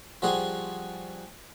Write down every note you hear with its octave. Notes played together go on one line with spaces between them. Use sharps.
F3 G3 C4 F#4 G#4